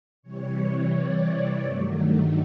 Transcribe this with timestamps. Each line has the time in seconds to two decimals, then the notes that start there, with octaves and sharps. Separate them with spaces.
0.22 C3 E3 G3 C#5
0.92 D5
1.62 G2 D#3 F#3 A3